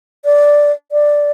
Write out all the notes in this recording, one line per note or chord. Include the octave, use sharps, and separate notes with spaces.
D5
D5